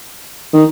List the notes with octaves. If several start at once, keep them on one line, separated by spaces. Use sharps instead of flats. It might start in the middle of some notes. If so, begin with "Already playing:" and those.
D#3